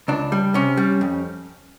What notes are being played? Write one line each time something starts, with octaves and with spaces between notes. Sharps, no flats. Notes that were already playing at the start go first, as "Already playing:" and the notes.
C#2 D4
G3
C3 C#4
G3
F2